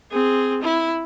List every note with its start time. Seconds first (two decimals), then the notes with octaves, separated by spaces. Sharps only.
0.11 C4 G#4
0.62 E4